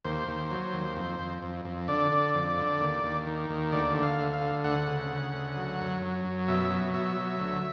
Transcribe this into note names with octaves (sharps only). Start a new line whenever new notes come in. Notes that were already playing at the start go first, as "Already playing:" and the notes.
D#2 C5
D#2
F#3
D#2
F2
F2
F2
F2
D3 D5
D3
F2
D3
D#2
D#2
D#3
D#2
D2 D5
D3
F5
D2
F5
D3
D2 F#5
C#3
C#3
D2
F#3
F#2
F#3
F#2
B2 E5
F#3
B2 E5
F#3
D2